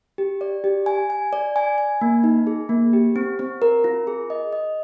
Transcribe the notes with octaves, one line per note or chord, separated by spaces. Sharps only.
G4
D5
G4
G#5
G#5
D5
G#5
G#5
A#3
D#4
G#4
A#3
G4
C4
C4
A#4
F4
G#4
D#5
D#5